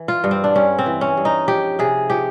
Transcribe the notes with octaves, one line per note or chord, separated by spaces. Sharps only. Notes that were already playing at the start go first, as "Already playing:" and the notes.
Already playing: E3
F4
G2
C4
D4
G3 C#4
C4
E3
C#4
G2
D#4
F3 G4
C3 G#4
F3 G4